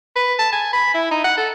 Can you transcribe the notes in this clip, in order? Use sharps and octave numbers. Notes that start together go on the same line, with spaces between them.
B4
A5
G#5
B5
E4
D#4
F#5
A4